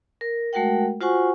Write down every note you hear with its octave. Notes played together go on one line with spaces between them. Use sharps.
A#4
G#3 A3 F#4 A#4 F#5 G5
F4 F#4 C5 F#5 G#5 C#6